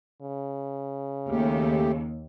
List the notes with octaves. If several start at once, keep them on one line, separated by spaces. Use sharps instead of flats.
C#3
D#2 A3 G4